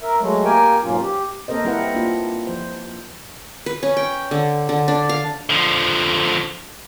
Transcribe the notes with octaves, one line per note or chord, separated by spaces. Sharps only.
A#4 E5
F#3 G#3 A3
A#3 G4 A#4 G5 G#5
G#2 B2 F#3 A#3 C#4 F4
G4
A#3 C4 A4 A#4 C5 D#5
G3 C4 E4 A#4 B4 F#5
A#3 D4 F4
F3 C5
B4
C#4
G5
D3
D3
D4
F5
D3 F3